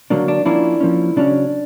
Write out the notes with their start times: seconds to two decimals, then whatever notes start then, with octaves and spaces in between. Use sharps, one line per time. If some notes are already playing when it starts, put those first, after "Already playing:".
0.10 D3 F#3 A#3 D4
0.28 D4
0.46 F3 A#3 C#4 D4 E4
0.81 F3 A#3 C#4
1.16 C#3 F#3 A#3 C#4 D4